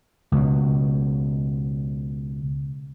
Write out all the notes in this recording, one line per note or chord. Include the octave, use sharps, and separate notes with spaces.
C#2 B2